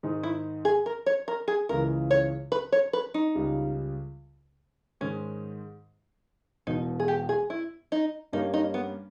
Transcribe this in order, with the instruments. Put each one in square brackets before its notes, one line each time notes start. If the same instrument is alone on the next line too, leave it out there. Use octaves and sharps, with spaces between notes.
[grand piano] G#2 D#3 G#3 D#4 G#4
[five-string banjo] E4
G#4
A#4
C#5
A#4
G#4
[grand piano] C#2 C#3 E3 G#3 [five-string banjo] A#4
[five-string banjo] C#5
B4
C#5
B4
D#4
[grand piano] C#2 C#3 G3
[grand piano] G#2 D#3 G#3 [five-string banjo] C#4
[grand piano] E1 E2 B2 [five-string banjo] D#4
[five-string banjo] G#4
G4
G#4
E4
D#4
[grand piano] G2 G3 A#3 C#4 [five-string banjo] D#4
[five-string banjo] D#4
B3